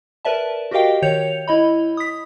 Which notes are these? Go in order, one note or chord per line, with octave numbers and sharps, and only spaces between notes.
A#4 B4 D5 E5 A5
F#4 G4 A#4 D#5 F5 G5
D#3 C#5 G6 C#7 F7
E4 D#5 B5
D#6 B6